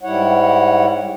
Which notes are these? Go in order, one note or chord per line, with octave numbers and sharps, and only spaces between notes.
G#2 G3 E4 C#5 F#5